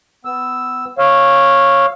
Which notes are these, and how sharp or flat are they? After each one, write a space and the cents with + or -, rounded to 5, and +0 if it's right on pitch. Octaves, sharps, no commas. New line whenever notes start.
B3 +20 E6 +0
C#5 -10 F5 +0 E6 +0